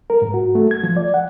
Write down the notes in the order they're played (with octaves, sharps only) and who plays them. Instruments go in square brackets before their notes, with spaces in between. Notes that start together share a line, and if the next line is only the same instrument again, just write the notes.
[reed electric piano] A#4
G#2
F#4
A3
G#6
F3
D5
F#5